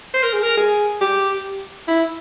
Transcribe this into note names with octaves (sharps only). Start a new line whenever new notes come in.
C5
A#4
G#4
A#4
G#4
G4
E4